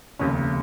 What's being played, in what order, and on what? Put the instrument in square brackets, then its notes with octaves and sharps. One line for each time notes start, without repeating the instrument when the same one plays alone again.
[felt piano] F1 D#2 C#3 C#4